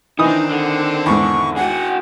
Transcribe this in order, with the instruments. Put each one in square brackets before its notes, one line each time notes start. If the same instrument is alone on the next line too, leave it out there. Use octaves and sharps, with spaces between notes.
[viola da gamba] D#3 C4 D4 [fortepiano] E3 D#6 [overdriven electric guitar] D#4
[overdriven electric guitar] D3
[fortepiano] E2 G#2 [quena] C#6
[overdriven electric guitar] F#4 G#4 [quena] F#5